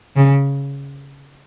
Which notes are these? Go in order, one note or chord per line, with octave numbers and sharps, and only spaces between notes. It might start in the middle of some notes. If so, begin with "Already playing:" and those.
C#3